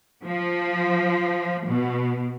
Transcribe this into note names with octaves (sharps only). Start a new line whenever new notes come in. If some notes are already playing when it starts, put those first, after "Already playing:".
F3
B2